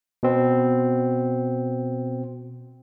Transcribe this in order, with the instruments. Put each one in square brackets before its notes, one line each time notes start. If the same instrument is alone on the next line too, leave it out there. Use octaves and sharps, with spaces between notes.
[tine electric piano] B2 C4